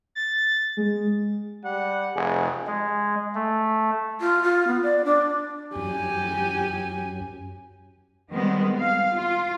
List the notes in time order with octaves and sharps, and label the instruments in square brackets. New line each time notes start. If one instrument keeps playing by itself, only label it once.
[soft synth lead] A6
G#3
[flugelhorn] G3 [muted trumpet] F#5
[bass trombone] F1 [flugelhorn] G#4
[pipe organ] G#3
A3
[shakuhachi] F4
F4
B3
D5
D4
[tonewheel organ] F#2 [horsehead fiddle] G4 G#5
[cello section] D#3 G3 G#3 B3 C4
F5
F4